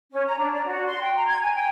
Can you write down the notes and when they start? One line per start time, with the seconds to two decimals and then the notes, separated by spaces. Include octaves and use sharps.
0.12 C#4
0.26 A#5
0.38 D4
0.53 D5
0.66 F#4
0.86 C6
1.02 G5
1.16 A#5
1.27 G#6
1.41 G#5
1.55 G5